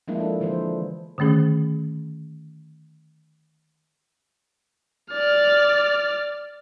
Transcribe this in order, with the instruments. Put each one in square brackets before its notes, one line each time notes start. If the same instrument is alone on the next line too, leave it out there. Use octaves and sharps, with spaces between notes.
[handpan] F3 G#3 A#3 D4 E4
A4
D3 E3 F3 C5
[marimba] D3 D#3 A3 C#4 G#4
[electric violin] D5 F6